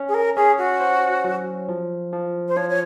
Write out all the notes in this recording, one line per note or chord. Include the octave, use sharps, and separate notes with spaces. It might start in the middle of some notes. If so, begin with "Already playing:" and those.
Already playing: C#4
G#4
A#4
C#4 G#4
F#4
C5
F#3
F3
F3
C5
F3 C#5
C#5